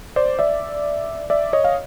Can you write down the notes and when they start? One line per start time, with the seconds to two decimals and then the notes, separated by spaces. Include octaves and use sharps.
0.16 C5 D5
0.39 D5 E5
1.30 D5 E5
1.53 C#5 D#5
1.64 F5